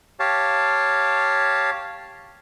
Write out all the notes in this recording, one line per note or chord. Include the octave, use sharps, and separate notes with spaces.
G4 C#5 F5 A5